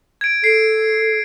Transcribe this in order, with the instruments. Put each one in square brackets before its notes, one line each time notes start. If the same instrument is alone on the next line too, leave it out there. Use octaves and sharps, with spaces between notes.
[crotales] G#6 D7
[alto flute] A4 [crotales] C7 D7